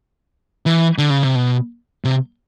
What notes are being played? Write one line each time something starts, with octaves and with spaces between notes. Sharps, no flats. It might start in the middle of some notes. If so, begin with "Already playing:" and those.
E3
D3
C#3
C3
B2
C3